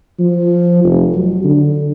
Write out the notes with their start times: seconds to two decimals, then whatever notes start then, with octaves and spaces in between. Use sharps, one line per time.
0.19 F3
0.84 F1
1.14 F#3
1.44 D3